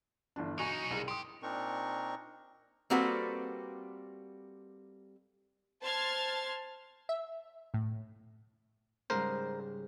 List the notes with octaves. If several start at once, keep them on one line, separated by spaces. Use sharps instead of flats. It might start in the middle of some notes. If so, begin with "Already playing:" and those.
G1 E3 D4
B1 D#4 F#4 G#5 C#6
C2 G#4
G4 C6 D#6
A#2 C4 D4 D#4 A#4 C#6
G3 A#3 C4 F#4 A4 B4
C5 A5 C6 F6 G#6 A6
E5
A2
G#2 C#3 G3 A#4 C5